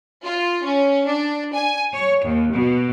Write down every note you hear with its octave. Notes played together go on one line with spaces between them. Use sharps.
F4
C#4
D4
G#5
C#5
D#2
B2